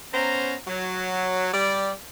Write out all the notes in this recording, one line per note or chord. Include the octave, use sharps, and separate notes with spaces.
B3 C#4 C5 A#5
F#3
G3 D5